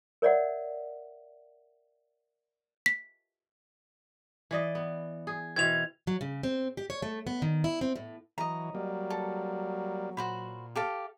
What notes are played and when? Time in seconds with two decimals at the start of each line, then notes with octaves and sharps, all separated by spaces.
0.22 A#4 C#5 D5 E5 F#5
2.86 B6
4.51 E3 D5 D#5
4.75 B3
5.27 G#4
5.56 B2 E3 C4 G#6 F7
6.07 F#3
6.21 C#3
6.43 C4
6.77 G4
6.90 C#5
7.02 A3
7.27 B3
7.42 D#3
7.64 E4
7.81 C4
7.96 A2
8.38 E3 F#3 D#5 A#5
8.75 F#3 G3 A#3
9.10 A4
10.17 A#2 F#4 C5 B5
10.76 G4 A4 F5